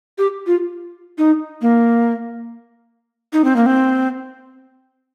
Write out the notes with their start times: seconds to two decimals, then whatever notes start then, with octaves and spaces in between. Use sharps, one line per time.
0.18 G4
0.47 F4
1.18 D#4
1.61 A#3
3.33 D#4
3.44 C4
3.56 A#3
3.66 C4